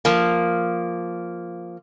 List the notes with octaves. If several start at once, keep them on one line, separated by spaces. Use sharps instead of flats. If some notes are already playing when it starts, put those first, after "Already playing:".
F3 A#3